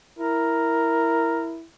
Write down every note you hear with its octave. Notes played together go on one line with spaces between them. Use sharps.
E4 A#4